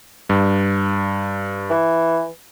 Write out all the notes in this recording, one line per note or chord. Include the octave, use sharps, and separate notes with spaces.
G2
E3